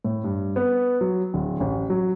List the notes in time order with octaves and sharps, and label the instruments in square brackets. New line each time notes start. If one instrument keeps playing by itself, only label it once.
[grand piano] A2
G2
B3
F#3
D1
A1
F#3